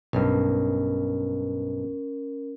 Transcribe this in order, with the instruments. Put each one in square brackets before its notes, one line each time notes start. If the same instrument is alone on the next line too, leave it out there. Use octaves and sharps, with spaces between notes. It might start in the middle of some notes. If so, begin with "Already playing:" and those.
[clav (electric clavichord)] B1 G2 [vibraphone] C#4 A#4